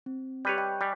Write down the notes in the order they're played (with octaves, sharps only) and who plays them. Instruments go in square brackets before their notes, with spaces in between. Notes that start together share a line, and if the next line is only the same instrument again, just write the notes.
[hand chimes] C4
[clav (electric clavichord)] G3 B4 C#5 [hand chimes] G4 F#6 G6
[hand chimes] D#5 G5 C#6
[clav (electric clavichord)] G3 [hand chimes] G#5 F#6 B6